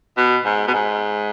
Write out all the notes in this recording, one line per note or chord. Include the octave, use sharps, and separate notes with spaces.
B2
G#2
B2
G#2